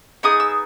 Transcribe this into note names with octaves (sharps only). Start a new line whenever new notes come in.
B3 D#4 G#4 D#6
E6